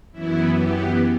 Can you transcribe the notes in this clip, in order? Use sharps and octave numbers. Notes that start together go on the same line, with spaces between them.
F#2 E3 B3 E4
G4